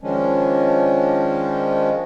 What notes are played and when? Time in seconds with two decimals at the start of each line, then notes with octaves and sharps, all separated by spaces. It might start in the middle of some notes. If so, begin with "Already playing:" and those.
0.01 D#3 F3 G#3 C#4 D4